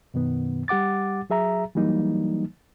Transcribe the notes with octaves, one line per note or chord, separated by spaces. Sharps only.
F#2 B2 D#3 B3
G3 G4 F#5 D6 A6
F#3 G#4 E5 A#5
E3 F#3 G3 A#3 D#4